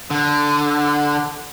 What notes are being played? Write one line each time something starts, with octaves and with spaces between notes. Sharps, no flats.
D3